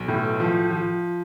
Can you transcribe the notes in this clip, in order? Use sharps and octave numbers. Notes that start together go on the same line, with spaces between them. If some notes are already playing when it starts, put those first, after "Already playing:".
Already playing: B1
A2
F3
F3